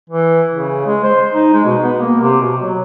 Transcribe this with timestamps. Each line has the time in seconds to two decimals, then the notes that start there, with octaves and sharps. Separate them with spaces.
0.10 E3
0.55 C#3
0.86 G#3
1.04 C5
1.34 D#4
1.53 G#3
1.66 B2
1.82 B3
2.00 A#3
2.21 C3
2.41 B2
2.59 F#3